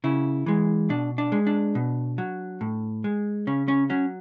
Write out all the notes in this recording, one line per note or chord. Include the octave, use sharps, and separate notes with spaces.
C#3 E4
E3 G#3
B2 D4
D4
G#3
D4
B2
F#3
A2
G#3
C#3 C#4
C#4
F#3 C#4